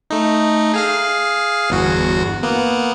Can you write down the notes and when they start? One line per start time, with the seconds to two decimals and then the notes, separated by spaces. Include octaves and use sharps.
0.10 A3 D#4
0.74 G#4 F5 F6
1.70 G1 E2 F#4
2.43 A#3 B3